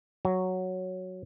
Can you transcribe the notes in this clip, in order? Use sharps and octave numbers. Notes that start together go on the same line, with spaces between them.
F#3